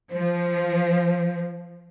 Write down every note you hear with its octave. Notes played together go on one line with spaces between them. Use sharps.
F3 C5